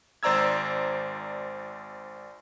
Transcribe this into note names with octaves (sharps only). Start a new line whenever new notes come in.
G#1 C5 D5 A#5 E6 G#6